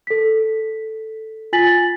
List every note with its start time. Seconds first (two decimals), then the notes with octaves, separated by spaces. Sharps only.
0.07 A4 B6
1.53 F4 G#5 A6 B6 F#7